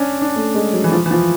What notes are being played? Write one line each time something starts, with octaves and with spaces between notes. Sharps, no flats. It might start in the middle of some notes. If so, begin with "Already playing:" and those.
Already playing: C#4 D4
D4
A3
G#3
F#3
E3
F3
E3
F3